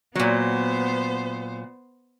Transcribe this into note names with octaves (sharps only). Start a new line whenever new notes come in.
A#2 F#3 B3 C5